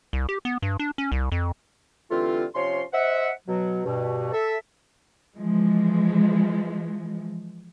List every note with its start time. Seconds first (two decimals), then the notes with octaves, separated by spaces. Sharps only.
0.13 C2
0.29 G4
0.45 B3
0.62 G2
0.79 D4
0.98 C#4
1.12 C2
1.32 F2
2.11 D3 E3 G3 A3 C4 F4
2.55 C3 F3 C#4 C#5 C6
2.93 C5 D#5 E5 F#5
3.47 B2 F#3
3.85 G2 B2
4.33 A4 E5
5.36 E3 F3 G#3